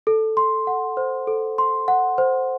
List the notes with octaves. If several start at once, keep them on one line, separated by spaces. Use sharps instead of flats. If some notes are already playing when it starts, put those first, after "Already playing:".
A4
C6
F#5
C5
A4
C6
F#5
C5